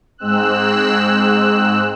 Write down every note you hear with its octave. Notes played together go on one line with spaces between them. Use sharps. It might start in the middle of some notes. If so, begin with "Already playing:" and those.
G#2 G#3 C4 E6 F#6